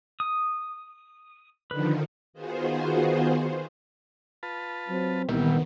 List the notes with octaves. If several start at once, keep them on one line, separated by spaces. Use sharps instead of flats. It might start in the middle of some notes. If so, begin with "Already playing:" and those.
D#6
D3 D#3 F3 B4
D#3 B3 F4 F#4 G#4 C5
F4 B4 A5
F#3 C4
C2 A#2 D#3 E3 G3 B3